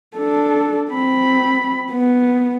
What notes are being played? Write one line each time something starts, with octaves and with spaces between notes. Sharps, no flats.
D4 A4
C4 B5
B3